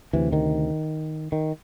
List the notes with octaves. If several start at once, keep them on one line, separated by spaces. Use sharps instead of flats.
D2 C3 E3
D#3
D#3